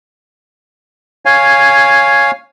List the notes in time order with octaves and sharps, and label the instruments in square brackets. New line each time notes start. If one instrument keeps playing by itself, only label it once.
[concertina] C#5 F5 G#5